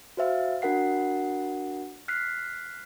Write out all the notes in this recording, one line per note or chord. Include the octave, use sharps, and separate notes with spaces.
F#4 C5 E5 F5
D4 F#4 A#4 F#5 C7
F6 F#6 B6 C7